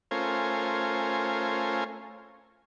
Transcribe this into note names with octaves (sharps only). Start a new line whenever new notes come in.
A3 C#4 F4 A#4 C5 G#5